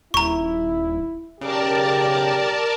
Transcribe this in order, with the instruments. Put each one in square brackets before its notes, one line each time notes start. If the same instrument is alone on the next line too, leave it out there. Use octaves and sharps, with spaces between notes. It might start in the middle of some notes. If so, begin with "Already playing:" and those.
[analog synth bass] D#1 [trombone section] E4 [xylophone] A#5 C#6
[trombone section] B1 G4 [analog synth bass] C#3 [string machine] A#4 D5 A5